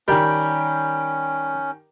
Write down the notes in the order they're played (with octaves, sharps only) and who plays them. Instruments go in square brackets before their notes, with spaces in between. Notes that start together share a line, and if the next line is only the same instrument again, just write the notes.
[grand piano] D#3 G4 A#4 [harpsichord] G3 [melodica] C#4